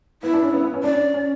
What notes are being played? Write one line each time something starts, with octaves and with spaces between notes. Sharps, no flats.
B3 E4
D4
C#4
B3
B3
C#4
D4 D5
C#4
C#4